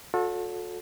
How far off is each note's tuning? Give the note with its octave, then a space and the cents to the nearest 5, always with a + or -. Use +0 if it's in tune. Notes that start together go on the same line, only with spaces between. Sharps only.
F#4 -45 A4 +0 C#5 +30